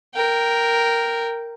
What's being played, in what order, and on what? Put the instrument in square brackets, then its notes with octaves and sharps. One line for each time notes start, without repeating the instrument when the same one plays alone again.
[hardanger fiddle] A#4 G5